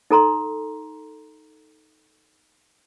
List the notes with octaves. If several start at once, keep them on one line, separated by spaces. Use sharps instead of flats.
D#4 A4 A#5 C6